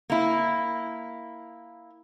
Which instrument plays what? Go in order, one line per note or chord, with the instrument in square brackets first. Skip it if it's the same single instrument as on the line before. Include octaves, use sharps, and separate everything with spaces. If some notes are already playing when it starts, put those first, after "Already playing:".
[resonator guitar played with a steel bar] A#3 E4